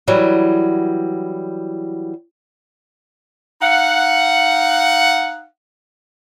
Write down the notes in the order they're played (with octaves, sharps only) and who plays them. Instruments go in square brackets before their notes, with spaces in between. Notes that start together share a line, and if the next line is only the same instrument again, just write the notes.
[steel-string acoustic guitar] E3 F#3 G3
[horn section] D#4 F5 F#5